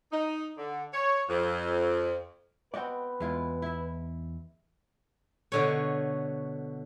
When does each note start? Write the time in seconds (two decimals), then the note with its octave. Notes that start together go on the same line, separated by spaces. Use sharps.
0.12 D#4
0.57 D3
0.93 C#5
1.29 F2
2.74 B3 C4 F#4 B4 D5 D#5 G5
3.20 E2 G#3 E4 F4
3.62 E4 E5
5.52 B2 D3 C#5